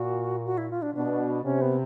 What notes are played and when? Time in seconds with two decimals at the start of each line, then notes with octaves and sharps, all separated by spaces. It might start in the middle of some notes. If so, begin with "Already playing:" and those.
Already playing: A#2 F#4
0.46 F#4
0.58 E4
0.70 F4
0.82 D4
0.95 B2 D4
1.44 C3 C#4
1.61 B3